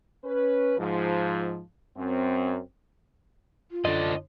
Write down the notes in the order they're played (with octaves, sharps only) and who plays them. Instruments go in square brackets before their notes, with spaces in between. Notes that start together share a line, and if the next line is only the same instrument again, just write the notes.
[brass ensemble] C#4 B4
G#2 F3
F#2 C4
[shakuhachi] F4
[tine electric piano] F#2 D3 [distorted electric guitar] D4 C5 [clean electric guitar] D#5